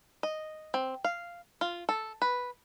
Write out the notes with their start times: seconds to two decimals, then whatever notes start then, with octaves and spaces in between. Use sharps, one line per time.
0.23 D#5
0.74 C4
1.04 F5
1.61 F4
1.89 A4
2.22 B4